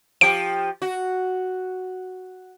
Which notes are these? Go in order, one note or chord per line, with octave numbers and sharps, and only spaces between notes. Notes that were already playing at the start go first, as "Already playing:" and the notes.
F3 G4 D7
F#4